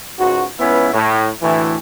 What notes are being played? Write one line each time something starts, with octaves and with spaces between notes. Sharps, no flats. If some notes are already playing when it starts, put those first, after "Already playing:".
C#2 G#2 F#4
C#2 B3 C#4 E4 B4
A2
D2 A2 E3